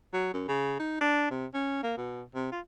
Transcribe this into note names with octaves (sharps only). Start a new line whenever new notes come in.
F#3
F#2
C#3
D#4
D4
C3
C#4
A#3
B2
C3
F4